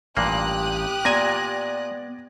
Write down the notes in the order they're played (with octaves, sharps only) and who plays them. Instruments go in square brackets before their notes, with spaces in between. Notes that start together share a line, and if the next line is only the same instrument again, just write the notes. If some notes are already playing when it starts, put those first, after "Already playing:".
[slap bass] A1 [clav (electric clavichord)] G2 A#2 A#3 [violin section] G4 D#6 F#6
[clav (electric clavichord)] A#2 G#5 [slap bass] B3 [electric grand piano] D5 G#6 A#6